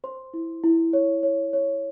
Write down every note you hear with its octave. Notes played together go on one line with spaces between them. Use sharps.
C5 C6
E4
E4
C#5
C#5
C#5